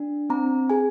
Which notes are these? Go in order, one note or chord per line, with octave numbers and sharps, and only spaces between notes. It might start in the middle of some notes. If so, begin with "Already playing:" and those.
Already playing: D4
C4 A#5
G#4 G#5